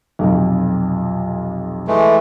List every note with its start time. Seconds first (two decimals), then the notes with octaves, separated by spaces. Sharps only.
0.19 B1 F2 C3
1.88 E3 G#3 A3